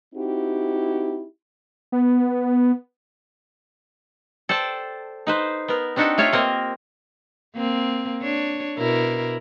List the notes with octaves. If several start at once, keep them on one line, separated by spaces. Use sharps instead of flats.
C4 D#4 E4 F#4 G4
B3
A4 C5 D5 G5 A5
D#4 B4 C5
B3 A#4
C4 D4 D#4 F#4 G4 A4
A3 F4 C#5 E5 F5
A#3 C4 A#4 D#5
A#3 C4
D4 C#5
B2 E4 A#4